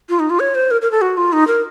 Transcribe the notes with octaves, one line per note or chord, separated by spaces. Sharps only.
F4
D#4
F4
C#5
C5
A#4
A#4
A4
F#4
F4
D#4
A#4